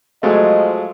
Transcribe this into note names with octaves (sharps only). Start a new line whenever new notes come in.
F3 F#3 G#3 A3 D#5